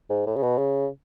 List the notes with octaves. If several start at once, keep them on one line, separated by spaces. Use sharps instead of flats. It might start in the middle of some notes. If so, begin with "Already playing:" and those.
G#2
A2
C#3
B2
C#3